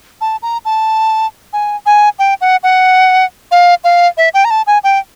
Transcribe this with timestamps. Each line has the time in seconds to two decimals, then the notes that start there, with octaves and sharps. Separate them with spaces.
0.21 A5
0.42 A#5
0.65 A5
1.53 G#5
1.86 G#5
2.19 G5
2.41 F#5
2.63 F#5
3.51 F5
3.84 F5
4.17 E5
4.34 G5
4.45 A#5
4.51 A5
4.67 G#5
4.84 G5